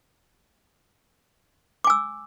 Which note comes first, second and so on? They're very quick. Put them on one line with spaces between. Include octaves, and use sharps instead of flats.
D6 G#5 E6